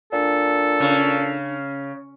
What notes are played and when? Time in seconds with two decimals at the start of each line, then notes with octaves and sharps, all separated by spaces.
0.13 A#2 D4 A4
0.80 C#3